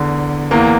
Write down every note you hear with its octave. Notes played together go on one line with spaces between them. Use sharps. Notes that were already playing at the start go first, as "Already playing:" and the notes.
Already playing: E2 D3
E2 E3 A#3